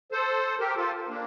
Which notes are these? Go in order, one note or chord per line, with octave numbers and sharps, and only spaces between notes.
A4 C5
G4 A#4
F4 A4
A#3 D4